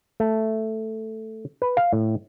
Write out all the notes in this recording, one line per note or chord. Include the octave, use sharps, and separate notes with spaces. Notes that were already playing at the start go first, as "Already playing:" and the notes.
A3
B4
F5
A2